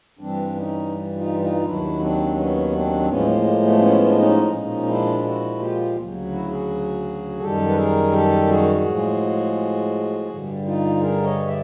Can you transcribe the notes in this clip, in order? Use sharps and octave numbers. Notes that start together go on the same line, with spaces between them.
G2 E3 G3 C4 D4
C#4 D#4
D#4 F4
D#4 F4
D#2 D#3 F#3 D4 E4
C4 D4
B3 C#4
C4 D4
A2 F3 G#3 B3 C#4
A#3
A#3
A3 B3
B3 C#4
D4
C#4 D#4
A#2 F3 G#3 C#4 D#4
D4 E4
E4 F#4
F4 G4
D2 C#3 F#3
E4 F#4
F#4 G#4
F#2 D#3 G3 G4 A4
B4
G#4 A#4
G4 A4
F#4 G#4
A2 F3 G#3
G2 D3 G3
D#4 F4
G#4 A#4
C#5 D#5
D5 E5